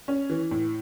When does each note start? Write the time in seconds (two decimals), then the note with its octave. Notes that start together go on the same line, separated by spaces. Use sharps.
0.08 C#4
0.30 E3
0.51 A2